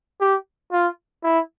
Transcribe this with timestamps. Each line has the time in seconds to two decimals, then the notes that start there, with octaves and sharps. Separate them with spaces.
0.20 G4
0.72 F4
1.23 E4